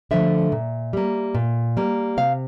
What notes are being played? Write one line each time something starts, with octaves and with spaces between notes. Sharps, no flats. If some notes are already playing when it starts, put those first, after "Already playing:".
D3 F3 A3 E5
A#2
G3 A#3
A#2
G3 A#3
C3 F5